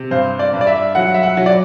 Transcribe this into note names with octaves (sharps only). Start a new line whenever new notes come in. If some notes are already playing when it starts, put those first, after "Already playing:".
Already playing: C3
G2 C5
D5
G2
D5
E5
F#3 F#5
E5
F#5
F#3
D5